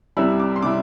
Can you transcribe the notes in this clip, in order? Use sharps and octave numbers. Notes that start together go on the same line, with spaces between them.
C2 C3 G3 E4 E6
D6
C6
C3 G3 E4 D6